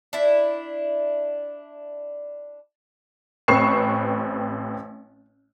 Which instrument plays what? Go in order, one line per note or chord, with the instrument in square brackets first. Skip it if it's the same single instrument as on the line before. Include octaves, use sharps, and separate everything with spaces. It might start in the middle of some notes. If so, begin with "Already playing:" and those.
[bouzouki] D4 E4
[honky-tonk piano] A1 C4 B4 C#6 C7 E7